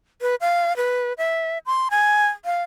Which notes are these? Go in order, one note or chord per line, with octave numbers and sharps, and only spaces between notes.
B4
F5
B4
E5
C6
G#5
F5